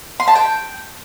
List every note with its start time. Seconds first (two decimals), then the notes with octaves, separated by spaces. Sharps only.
0.20 C6
0.28 A5
0.35 G5